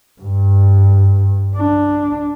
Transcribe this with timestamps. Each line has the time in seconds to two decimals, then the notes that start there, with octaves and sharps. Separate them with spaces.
0.21 G2
1.56 D4